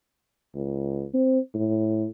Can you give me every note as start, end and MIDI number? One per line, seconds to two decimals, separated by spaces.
0.55 1.06 37
1.14 1.39 60
1.54 2.06 45